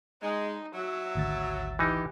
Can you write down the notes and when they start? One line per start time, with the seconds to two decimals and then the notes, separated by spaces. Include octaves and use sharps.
0.22 G#3 D#4
0.74 F#3 E5
1.15 G#1 D2 A6
1.79 E3 D#4 G4